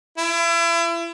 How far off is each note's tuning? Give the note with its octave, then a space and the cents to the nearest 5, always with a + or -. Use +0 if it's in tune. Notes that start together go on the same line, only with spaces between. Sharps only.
E4 +35